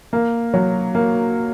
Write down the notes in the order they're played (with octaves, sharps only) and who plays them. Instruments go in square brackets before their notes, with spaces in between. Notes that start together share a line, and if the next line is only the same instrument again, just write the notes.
[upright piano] A#3
F#3
A#3